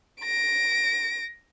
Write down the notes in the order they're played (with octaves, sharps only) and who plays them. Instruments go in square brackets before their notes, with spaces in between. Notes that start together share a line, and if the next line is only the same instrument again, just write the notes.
[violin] A#6 D7